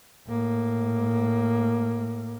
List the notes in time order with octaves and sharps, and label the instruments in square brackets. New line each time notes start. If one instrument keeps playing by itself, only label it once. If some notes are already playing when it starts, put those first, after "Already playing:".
[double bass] A2 A#3